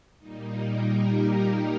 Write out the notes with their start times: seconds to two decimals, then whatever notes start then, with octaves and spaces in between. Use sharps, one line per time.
0.18 A#2 G3 A#3 D#4
0.53 A#4
0.87 G4